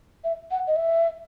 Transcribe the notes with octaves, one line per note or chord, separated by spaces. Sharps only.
E5
F#5
D#5
E5